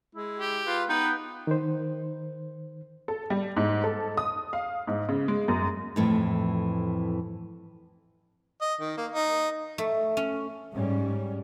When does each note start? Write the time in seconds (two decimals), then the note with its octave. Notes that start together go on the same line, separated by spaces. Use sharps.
0.15 G#3 E4
0.40 G4
0.66 F4 B4
0.89 B3 D#4 B4 G5
1.47 D#3 C5
3.08 A4
3.30 G3
3.57 G#2
3.84 A4
4.17 D#6
4.53 F5
4.87 G#2
5.09 C#3
5.28 G#3
5.48 F#2
5.96 F2 A2 E3
8.61 D#5
8.80 D#3
8.97 A#3
9.12 D#4
9.78 A3
10.17 C#4
10.75 G#2 G3 C#4